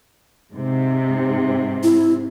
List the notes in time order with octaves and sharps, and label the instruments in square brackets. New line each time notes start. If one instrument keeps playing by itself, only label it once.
[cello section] G#2 C3
[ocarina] E4